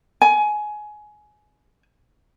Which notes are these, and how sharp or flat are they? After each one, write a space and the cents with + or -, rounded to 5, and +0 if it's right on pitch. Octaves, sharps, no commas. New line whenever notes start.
G#5 +20